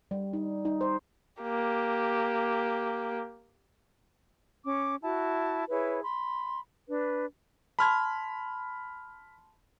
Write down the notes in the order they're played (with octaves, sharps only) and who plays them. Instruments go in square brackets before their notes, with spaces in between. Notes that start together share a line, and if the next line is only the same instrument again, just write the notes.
[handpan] G3
D#4
D#4
C5
[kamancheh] A#3 G4
[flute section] C#4 D6
E4 F#4 A5
E4 G#4 B4 C#5
B5 C6
D4 B4
[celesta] A5 C6 G#6 [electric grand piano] B5 F6